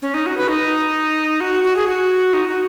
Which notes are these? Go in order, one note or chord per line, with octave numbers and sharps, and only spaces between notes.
C#4
D#4
F#4
B4
D#4
F#4
F#4
G#4
F#4
D#4
F#4